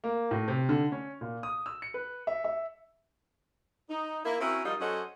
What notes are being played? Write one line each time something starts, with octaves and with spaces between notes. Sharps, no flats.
A#3
A2
C3
D3
C#4
A#2
D#6
E6
C#7
B4
E5
E5
D#4
A#3 E4
C4 C#4 E4 F#4 A#4
F3 G3 D#4 F4 A#4 D#5
F#3 C#4 A4 C5 D#5 F#5